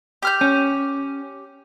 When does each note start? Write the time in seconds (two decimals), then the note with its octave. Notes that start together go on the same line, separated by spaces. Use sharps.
0.22 G4 F6 G6
0.41 C#4